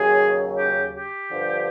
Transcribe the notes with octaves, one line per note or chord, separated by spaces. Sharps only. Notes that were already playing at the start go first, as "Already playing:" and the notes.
Already playing: D#2 C#3 F#3 G#4
G4
G4
G2 D3 F3